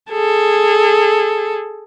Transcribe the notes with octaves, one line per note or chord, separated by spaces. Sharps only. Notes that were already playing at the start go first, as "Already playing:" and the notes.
G#4 A4